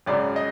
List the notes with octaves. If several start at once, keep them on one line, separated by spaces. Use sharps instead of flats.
G#1 F#2 C#3 D5
D#5